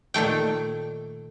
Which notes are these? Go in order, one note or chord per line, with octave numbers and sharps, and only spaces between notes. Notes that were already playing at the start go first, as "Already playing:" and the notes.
A#2 D#3 A3 G5